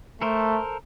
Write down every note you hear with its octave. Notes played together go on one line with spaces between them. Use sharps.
A3 A4 A#4 C5